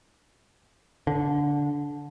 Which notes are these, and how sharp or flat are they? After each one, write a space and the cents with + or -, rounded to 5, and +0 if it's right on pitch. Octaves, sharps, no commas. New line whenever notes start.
D3 -15